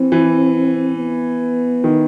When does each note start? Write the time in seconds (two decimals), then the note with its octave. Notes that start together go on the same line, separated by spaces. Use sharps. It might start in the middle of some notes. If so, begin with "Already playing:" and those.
Already playing: E3 C4
0.12 E3
0.97 B3
1.84 D#3